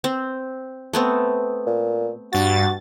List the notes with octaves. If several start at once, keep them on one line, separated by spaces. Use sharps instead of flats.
C4
A3 B3 C4
A#2
G2 F#4 A6